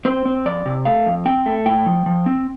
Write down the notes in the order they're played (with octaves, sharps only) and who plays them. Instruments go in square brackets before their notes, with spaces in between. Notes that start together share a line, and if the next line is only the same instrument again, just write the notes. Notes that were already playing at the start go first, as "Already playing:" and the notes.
[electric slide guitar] C4 C5
C4
F2 D5
C3
A3 F5
F2
C4 G5
A3
A2 G5
F3
F3
C4